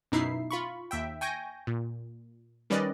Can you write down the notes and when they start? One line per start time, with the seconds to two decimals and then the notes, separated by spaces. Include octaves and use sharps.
0.12 F#2 B2 D#4 E4 E5 C7
0.51 F4 B5 C#6
0.91 D#2 E5 G5
1.21 G5 G#5 C#6 G6 A#6
1.67 A#2
2.70 D#3 G3 C#4 B4 D5 D#5